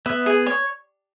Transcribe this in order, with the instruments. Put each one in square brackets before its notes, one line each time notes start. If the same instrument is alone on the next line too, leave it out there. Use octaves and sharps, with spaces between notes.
[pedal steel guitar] B3 [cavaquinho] E5
[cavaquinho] G#4
C#5